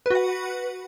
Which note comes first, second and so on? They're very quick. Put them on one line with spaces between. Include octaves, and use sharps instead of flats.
B4 F#4 F#5